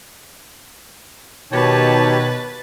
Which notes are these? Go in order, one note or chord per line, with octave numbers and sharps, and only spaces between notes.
B2 D#3 D#4 G4 B4 C#5 A5 A6